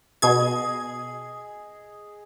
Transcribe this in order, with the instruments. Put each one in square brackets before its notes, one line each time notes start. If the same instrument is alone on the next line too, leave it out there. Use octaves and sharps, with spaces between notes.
[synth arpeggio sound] B2 G#6 [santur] G#4 D#5